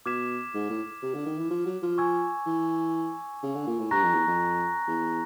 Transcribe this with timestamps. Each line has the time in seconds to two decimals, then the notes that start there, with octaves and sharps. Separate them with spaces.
0.06 B2 D6 F6 G#6 B6 E7
0.54 G#2
0.70 A2
1.03 C3
1.14 D3
1.26 D#3
1.38 E3
1.51 F3
1.66 F#3
1.83 F3
1.98 G#5 C#6 E6 G#6
2.46 E3
3.43 C#3
3.55 D3
3.67 A#2
3.79 A2
3.91 G2 A#5 C#6 F#6 A#6
4.03 F2
4.15 E2
4.27 F2
4.88 E2